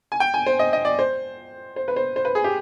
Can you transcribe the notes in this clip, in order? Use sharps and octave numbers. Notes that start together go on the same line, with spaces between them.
G#5
G5
G#5
C5
D#5
D#5
D5
C5
C5
B4
C5
C5
B4
G#4
G4